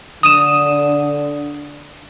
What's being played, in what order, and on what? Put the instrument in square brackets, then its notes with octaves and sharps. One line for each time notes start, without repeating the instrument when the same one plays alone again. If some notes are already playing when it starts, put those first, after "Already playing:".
[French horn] D3 [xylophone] D#6 D#7 E7